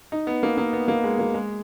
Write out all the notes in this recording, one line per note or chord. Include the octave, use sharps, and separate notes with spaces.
D#4
B3
A#3
A#3
B3
A#3
G#3
A#3
G#3